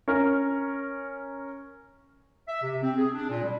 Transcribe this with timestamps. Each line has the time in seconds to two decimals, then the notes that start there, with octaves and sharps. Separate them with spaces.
0.08 C#4 A#4
2.48 E5
2.63 C3
2.83 C4
2.97 G#4
3.14 D4
3.30 A#2
3.43 G3